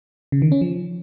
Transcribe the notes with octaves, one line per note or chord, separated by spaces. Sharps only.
C#3
D#3
C#4
F3